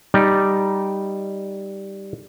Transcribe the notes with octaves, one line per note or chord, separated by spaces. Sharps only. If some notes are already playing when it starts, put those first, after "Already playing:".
G3 D#4 D5